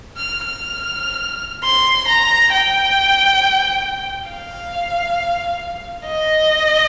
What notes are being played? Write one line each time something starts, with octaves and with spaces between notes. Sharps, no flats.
F6
F6
C6
A#5
G5
F5
D#5